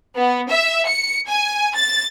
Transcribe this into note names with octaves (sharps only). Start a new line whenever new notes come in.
B3
E5
C#7
G#5
A6